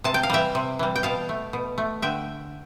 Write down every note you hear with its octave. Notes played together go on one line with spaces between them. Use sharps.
C3 A5
G5
F5
E3 G3 E5 G5
C3
E3 G3
G5
B2 F5 A5
A3
B2
A3
D3 E5 G5